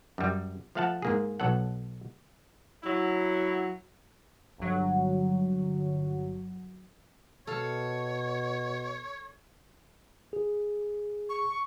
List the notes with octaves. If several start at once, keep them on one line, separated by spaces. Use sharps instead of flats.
F#2 G3
F3 A3 F5 F#5 A5
G#2 A#3 G#4
B1 F#3 A4 F#5
F#3 E4
G1 F#3
B2 A4 C#5 F5
G#4
C#6